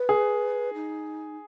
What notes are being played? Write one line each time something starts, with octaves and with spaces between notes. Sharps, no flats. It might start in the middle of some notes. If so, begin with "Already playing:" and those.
Already playing: B4
G#4
D#4